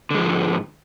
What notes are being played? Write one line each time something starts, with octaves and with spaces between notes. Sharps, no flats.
G#2 D3 F3 G#3